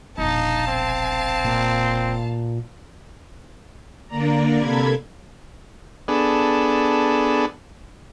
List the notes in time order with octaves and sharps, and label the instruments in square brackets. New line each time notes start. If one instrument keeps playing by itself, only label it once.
[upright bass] E1 A#1 [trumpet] D#4 [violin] F5 A5
[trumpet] C4
[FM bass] A#2
[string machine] D3 A#3 D5 A#5
C3 A#3 A4 B5 G#6
[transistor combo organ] B3 D4 G#4 A4